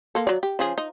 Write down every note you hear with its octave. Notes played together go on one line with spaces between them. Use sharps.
A#3 A4
F#3 D5
G4
C#3 F3 G#4
D#4